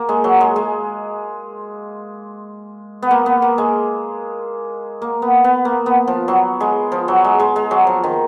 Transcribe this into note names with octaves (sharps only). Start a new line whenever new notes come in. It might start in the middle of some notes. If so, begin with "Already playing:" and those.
Already playing: A#3
G#3
F#3
G#3
G#3
B3
A#3
B3
A#3
G#3
A#3
B3
B3
A#3
B3
F3
F#3
G#3
F3
F#3
G#3
G#3
G#3
F#3
F3
D#3